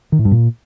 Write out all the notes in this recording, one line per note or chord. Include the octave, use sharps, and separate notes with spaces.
D#3
A2
G2
A#2